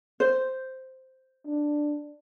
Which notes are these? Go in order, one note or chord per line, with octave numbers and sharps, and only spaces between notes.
C5
D4